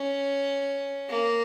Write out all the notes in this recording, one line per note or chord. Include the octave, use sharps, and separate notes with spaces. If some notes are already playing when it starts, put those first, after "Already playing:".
Already playing: C#4
A#3